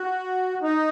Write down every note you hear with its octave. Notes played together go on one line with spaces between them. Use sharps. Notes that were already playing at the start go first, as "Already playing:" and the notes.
Already playing: F#4
D#4